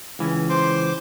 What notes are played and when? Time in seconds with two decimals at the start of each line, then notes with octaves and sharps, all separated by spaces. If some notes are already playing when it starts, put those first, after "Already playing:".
0.19 C#2 E3 C#4
0.49 C5 C6 D6